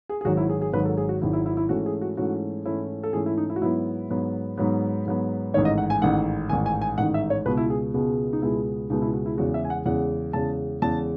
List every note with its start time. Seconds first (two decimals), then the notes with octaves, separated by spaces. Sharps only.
0.09 G#4
0.21 G#4
0.25 G#1 G#2 D#3 F#3 F#4
0.37 E4
0.49 G#4
0.62 G#4
0.73 G#1 G#2 D#3 F#3 B4
0.85 A4
0.97 G#4
1.09 F#4
1.22 G#1 G#2 D#3 F#3 E4
1.33 E4
1.46 E4
1.57 E4
1.69 G#2 E3 A3 C#4 F#4
1.86 G#4
2.01 F#4
2.17 G#2 E3 A3 C#4 F#4
2.65 G#2 E3 A3 C#4 E4
3.03 A4
3.13 G#2 E3 A3 C#4 G#4
3.26 E4
3.38 D#4
3.50 E4
3.56 F#4
3.62 G#2 F#3 B3 E4
4.10 G#2 F#3 B3
4.57 G#2 F#3 B3
5.05 G#2 F#3 B3
5.54 A1 G#2 D#3 C#5
5.65 D#5
5.78 F#5
5.90 G#5
6.01 A1 G#2 D#3 F#5
6.49 A1 G#2 D#3 G#5
6.66 G#5
6.82 G#5
6.98 A1 G#2 D#3 F#5
7.14 E5
7.30 C#5
7.46 C#2 B2 G#3 B3 B4
7.57 E4
7.70 G#4
7.94 C#2 B2 G#3 B3
8.33 D#4
8.42 C#2 B2 G#3 B3 E4
8.90 C#2 B2 G#3 B3 D#4
9.02 E4
9.13 F#4
9.26 E4
9.37 E2 C#3 G#3 F#4
9.54 E5
9.65 G#5
9.70 F#5
9.86 E2 C#3 G#3 F#5
10.33 E2 C#3 G#3 A5
10.82 E2 C#3 G#3 A5